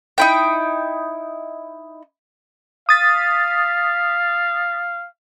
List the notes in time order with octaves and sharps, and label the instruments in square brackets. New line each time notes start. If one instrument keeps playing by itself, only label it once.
[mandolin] D#4 E4 G5
[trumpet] F5 [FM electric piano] D#6 A6 B6